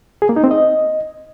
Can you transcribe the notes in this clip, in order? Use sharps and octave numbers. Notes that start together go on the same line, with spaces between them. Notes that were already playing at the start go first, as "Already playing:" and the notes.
G#4
A#3
D#4
C4
D#5